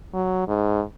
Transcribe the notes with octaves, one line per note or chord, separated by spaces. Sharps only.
F#3
G#2